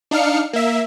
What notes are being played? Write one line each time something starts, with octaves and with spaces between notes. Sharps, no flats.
D4 D#4 F5 F6 C#7
A#3 E5